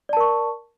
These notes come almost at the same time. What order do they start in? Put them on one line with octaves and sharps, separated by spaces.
D5 A5 A#4 C#6